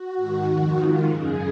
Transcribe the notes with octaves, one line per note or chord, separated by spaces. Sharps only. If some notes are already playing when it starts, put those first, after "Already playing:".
Already playing: F#4
G#2
D#3
F2 D#3
G#2 D#3 F4
F#2 C#3 G#4